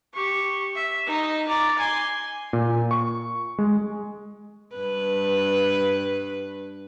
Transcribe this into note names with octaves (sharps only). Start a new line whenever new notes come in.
G4 C#6
E5
D#4 D#5
D5 A#5
G#5 C6
A#2
C#6
G#3
G2 B4